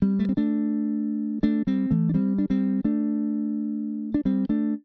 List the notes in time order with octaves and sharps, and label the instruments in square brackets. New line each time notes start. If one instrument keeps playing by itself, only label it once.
[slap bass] G3 C4
A3
C4
A3 D4
A3 D4
G3 C4
E3 A3
D4
G3 C4
D4
G3 C4
A3 D4
D4
G3 C4
A3 D4